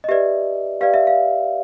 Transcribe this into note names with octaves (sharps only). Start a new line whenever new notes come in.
D#5
G4 B4 D5 E5
G4 B4 D5 F5
E5
F5